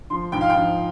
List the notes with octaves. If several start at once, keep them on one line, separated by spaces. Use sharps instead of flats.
F3 C6
G#2 G5
F5
G5
F3